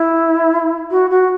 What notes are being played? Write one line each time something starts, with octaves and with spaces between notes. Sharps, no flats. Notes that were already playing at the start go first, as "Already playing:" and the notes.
Already playing: E4
F#4
F#4